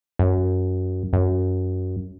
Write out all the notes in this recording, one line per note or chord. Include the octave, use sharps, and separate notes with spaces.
F#2
F#2